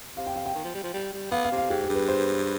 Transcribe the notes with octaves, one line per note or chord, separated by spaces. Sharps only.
C3 F5
G5
F5
G5
D#3
F3
G3
F3
G3
G3
B3 F5
F5
C3
F5
G#2 G4
G#4
G2
B4
C5